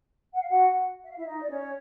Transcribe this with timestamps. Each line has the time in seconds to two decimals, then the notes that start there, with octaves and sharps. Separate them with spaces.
0.33 F#5
0.41 F5
0.49 F#4 F#5
1.03 E5
1.10 F5
1.17 E4 E5
1.26 D#4 D#5
1.42 D5
1.49 C#4 C#5